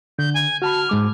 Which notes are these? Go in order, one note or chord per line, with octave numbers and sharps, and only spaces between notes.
D3 G6
G#5
F#4 A5 B5 F6
G#2 G#3 D6